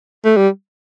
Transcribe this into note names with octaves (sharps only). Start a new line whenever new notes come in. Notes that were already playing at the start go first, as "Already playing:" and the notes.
A3
G3